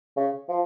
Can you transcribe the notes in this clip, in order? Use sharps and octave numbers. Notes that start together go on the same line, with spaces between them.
C#3
F3